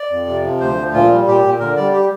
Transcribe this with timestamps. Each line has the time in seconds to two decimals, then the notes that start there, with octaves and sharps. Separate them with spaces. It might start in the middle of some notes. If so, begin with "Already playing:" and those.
Already playing: D5
0.10 F2
0.27 C3
0.44 F3
0.60 D2 C5
0.77 F3
0.93 A#2 F4
1.10 G3
1.26 A#2 G4
1.44 A#2
1.60 D3 A#4
1.76 G3 D5
1.93 G4